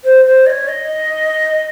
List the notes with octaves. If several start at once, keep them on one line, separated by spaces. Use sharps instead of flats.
C5
C5
D#5
C#5
D#5